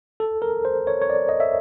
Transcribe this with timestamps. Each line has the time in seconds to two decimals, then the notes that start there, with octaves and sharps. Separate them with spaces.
0.20 A4
0.42 A#4
0.65 C5
0.87 C#5
1.02 C#5
1.10 D5
1.29 D#5
1.40 E5